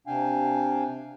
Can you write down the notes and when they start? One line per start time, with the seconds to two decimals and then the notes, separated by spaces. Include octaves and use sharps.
0.07 C3 D4 F5 G5 G#5